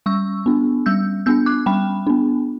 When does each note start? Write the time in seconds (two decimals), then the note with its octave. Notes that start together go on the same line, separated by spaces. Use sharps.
0.06 G3 C#6 E6
0.46 B3 D4
0.86 G3 E6 G6
1.26 B3 D4 E6 G6
1.46 D6 F#6
1.66 G3 G5 B5
2.07 B3 D4